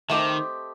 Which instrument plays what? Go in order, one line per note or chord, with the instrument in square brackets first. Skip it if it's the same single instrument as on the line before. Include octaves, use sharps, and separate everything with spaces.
[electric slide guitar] D#3 [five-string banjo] A3 C4 G4 C5 D#5